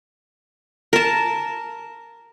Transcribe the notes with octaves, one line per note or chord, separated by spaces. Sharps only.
A#4 A5